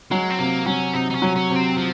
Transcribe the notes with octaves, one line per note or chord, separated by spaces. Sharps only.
F#3 G#3
C4
C3 A#3
F#3 C#4
C3 D#4
D#4
C#4
F#3
C#4
C3
C4
F3